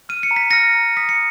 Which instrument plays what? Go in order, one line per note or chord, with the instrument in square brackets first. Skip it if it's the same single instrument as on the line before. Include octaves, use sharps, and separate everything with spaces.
[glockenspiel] F6 D#7
C#7
A#5
B6
F6 A#6 C#7
A#5
D#6 B6
C#7